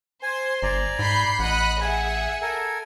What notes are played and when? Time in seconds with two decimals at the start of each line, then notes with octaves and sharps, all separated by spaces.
0.23 C5 G#5 C6
0.63 G1 D5 G#5 A#5
0.99 G#2 B5 G6 C7
1.39 A1 D#5 F#5 B5 F#6
1.80 G#4 E5 F#5 G#5
2.42 A4 A#4 G#5